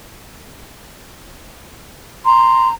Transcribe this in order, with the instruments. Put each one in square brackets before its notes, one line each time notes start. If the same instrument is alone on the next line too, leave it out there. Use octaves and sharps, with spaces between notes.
[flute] A#5 [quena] C6